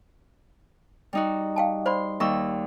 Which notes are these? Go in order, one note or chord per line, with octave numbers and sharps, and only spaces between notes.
G3 D#4 F#4
F5 G5 A5
C5 D5 B5 C6
D#2 G3 E5 C#6 E6